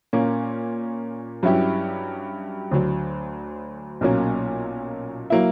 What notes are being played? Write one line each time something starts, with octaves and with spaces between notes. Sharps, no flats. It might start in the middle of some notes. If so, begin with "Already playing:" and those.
A#2 A#3 C#4
G2 F#3 C#4 E4 G4
D2 D3 F#3
B1 A#2 F#3 A#3 C#4
F#3 A#3 E4